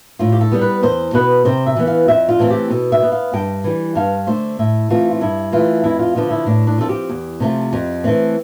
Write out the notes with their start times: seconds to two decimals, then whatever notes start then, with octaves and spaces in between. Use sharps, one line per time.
0.19 A2 F4
0.32 G4
0.41 A4
0.52 G3 B3
0.61 B4
0.83 E2 C5
1.13 B2 B3 B4
1.45 C3 C5
1.66 E5
1.76 E3 B3
1.87 F5
2.08 F2 E5
2.29 F4
2.39 E3 A3 C4
2.50 G4
2.70 B2 A4
2.92 E5
3.02 B3
3.12 F5
3.33 G2 G5
3.64 E3 G3
3.95 G2 F5
4.27 D3 A3 C5
4.59 A2 E5
4.90 E3 A3 C4 F4
5.12 F4
5.21 G2 E4
5.52 E3 A3 F4
5.84 F2 E4
5.99 F4
6.15 D3 F3 B3 F4
6.31 E4
6.46 A2 D4
6.67 D4
6.78 F3 C4 A4
6.89 G4
7.09 E2
7.40 C3 F3 A3
7.73 F2
8.04 E3 A3 C4